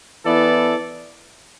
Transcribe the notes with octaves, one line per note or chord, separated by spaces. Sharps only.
E3 B3 E4 A4 D5